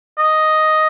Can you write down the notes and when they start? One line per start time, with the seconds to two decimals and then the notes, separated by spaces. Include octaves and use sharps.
0.18 D#5